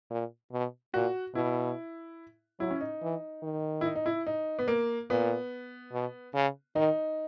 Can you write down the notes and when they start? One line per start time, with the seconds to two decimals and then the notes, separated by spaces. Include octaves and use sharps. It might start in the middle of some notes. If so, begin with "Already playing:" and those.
0.11 A#2
0.52 B2
0.94 A#2 F#4
1.35 B2 E4
2.60 F#3 E4
2.71 C#4
2.81 D#4
3.02 E3
3.43 D#3
3.81 E4
3.85 D#4
3.95 D#4
4.06 E4
4.27 D#4
4.59 B3
4.68 A#3
5.10 A#2 B3
5.93 B2
6.34 C#3
6.76 D#3 D#4